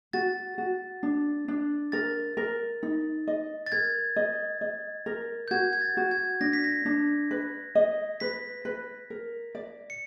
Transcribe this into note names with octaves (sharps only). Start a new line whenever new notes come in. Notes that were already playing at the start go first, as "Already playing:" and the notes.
F#4 A6
F#4
D4
D4
A#4 A6
A#4
D#4
D#5
A6
A#4 G#6
D#5
D#5
A#4
G6
F#4 G#6
G#6
A6
F#4
G#6
D4 A#6
B6
A#6
D4
B4
D#5
B4 B6
B4
A#4
D5
C#7